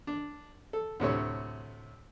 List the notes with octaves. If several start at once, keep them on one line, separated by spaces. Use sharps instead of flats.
D4
A4
D2 A2 C3 C#5